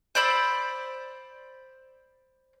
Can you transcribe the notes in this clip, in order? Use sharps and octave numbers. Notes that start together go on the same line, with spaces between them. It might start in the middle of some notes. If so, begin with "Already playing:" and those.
C5 D5 B5 E6